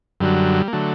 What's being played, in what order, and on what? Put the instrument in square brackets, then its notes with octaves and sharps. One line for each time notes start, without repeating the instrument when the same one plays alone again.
[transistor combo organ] F#2 D3 F#3 G3
A#3
D3 F#3 A3